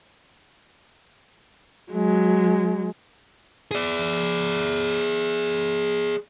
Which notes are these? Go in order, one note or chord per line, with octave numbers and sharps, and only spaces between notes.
F#3 G#3
G#4 D5